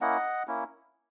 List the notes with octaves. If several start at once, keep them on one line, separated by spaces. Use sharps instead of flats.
A#3 C#4 E4 D#5 F#5
A#3 C#4 E4